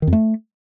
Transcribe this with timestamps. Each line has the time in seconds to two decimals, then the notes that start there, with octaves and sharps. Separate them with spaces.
0.02 D#3
0.07 F2
0.13 A3